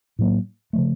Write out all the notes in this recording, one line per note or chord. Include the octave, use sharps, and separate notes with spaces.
A2 F#3 A#3
C#3 F3 A3